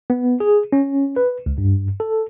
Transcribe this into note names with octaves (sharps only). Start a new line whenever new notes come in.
B3
G#4
C#4
B4
C#2
G2
A4